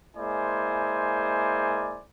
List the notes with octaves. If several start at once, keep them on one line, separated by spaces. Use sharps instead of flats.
G#3 A#3 E4 C5 D5 G#5